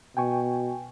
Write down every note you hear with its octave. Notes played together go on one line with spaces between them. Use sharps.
B2 G5 G#5 C#6